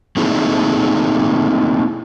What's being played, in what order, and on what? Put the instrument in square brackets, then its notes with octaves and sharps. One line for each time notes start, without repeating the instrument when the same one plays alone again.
[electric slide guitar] A3 A#3 C4 D#4 E4 G#4